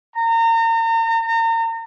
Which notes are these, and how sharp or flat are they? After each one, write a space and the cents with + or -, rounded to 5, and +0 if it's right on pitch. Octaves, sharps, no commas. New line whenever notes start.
A#5 -35